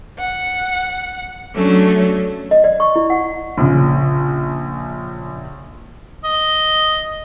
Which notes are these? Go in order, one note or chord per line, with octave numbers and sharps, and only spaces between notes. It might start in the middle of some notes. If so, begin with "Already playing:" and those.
F#5
F#3 A3 C#4 D4
D#5
D5
C#6
E4
F#5
A#1 C#3
D#5